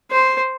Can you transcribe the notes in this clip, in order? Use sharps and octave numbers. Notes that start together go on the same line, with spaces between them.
C5